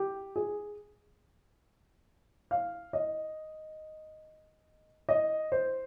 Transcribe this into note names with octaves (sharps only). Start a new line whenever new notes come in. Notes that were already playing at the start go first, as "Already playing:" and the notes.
Already playing: G4
G#4
F5
D#5
D#5
C5